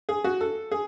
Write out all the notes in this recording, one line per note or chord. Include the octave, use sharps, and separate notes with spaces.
G#4
F#4
A4
G#4